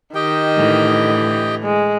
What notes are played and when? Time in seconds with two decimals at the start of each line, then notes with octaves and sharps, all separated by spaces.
0.15 D#3 G4 D#5 G5
0.56 A2 D3 E3
1.64 G#3